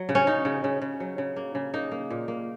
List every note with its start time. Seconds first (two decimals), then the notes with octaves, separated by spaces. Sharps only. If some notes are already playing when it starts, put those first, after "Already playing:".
Already playing: F#3
0.09 C#3
0.15 C#4
0.27 C#3 D#4
0.45 C#3
0.64 C#3
0.82 C#3
1.00 F#3
1.18 C#3
1.36 A#3
1.55 C#3
1.74 A#3 D#4
1.91 A#3
2.10 A#2
2.28 A#3